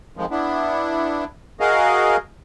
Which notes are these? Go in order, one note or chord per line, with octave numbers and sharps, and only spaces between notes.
F2 D#3 F3 G#3
B3 D4 E4
F#4 G#4 A#4 D#5 F5